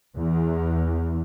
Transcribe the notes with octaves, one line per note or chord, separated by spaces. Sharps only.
E2